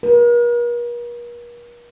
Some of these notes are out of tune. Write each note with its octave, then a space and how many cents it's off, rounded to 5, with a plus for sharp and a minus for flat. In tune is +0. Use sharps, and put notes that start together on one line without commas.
A#4 +45